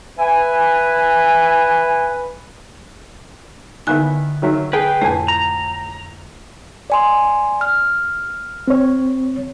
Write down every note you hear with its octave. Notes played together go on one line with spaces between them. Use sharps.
B4 E5 G#5
D3 D#3 B3 E4 G#5
D#3 F#3 E5
G#4 B4 G5
F2 A2 A3 G#5
A#5
D5 G#5 C6
F6
C4 C#5